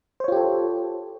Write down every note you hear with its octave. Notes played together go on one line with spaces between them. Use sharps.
F4 G4 A4 C5 C#5